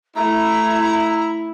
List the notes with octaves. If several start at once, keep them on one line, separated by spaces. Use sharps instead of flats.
A3 E4 A#5